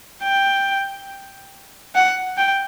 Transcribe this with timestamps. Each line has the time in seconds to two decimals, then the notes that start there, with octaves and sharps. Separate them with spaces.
0.23 G5
1.95 F#5
2.38 G5